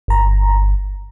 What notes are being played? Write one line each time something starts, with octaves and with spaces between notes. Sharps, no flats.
G1 A#5